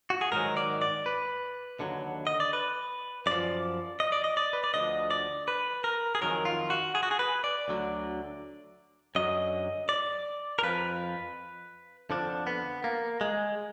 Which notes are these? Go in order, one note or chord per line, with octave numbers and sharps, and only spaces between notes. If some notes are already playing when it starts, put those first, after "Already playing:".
F#4
G#4
G#2 D#3 F#3 A#4
D5
D5
B4
D#2 D3 F#3
D#5
D5
B4
F#2 F3 D5
D#5
D5
D#5
D5
B4
D5
D2 D3 F3 D#5
D5
B4
A#4
G#4
F2 D#3 F#3 A#4
F4
F#4
G#4
F#4
G#4
B4
D5
D2 D3 F#3
F#2 D3 F#3 D#5
D5
A#4
F2 F3 B4
F2 D3 F3 D4
B3
A#3
G#3